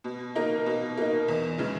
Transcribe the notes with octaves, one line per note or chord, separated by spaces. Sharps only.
B2
A#3 D#4
B2
A#3 D#4
E2
C#3 E3 G#3